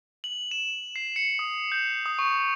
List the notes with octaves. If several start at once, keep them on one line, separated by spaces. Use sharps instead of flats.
F#7
E7
C7
C#7
D#6
G6
D#6
C#6